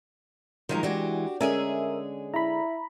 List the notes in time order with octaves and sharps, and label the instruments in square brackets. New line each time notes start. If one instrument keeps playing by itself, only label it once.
[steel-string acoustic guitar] D#3 D#4 A#4 [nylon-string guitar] F3 F#3 G#3
[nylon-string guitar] E3 G#3 [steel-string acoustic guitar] D4 F#4 G4
[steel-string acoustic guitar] D3 G#3 G#4 [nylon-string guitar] C#4 [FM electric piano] A#4 E5
[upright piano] E4 [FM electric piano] A#5 B5